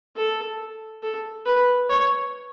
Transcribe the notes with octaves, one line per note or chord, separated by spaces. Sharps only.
A4
A4
B4
C#5